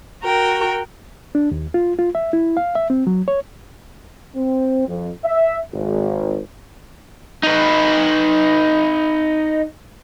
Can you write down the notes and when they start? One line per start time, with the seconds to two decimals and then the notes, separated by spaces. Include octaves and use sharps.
0.23 F#4 A#4 G5
1.35 D4
1.52 D#2
1.74 F4
1.99 F4
2.15 E5
2.33 E4
2.57 F5
2.75 E5
2.90 C4
3.07 F#3
3.28 C#5
4.36 C4
4.87 F2
5.25 E5
5.74 G#1
7.43 D#4 B4